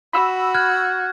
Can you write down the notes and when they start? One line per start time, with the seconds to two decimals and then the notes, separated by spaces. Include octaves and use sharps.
0.13 F#4 B5 E6
0.54 F6 F#6 G#6